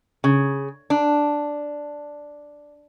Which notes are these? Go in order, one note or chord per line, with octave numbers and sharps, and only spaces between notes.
C#3
D4